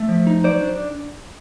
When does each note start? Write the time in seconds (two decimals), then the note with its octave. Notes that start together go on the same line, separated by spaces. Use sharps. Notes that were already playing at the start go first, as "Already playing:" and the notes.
Already playing: A3
0.09 F3
0.27 D#4
0.44 F#3 C5 D5
0.61 D4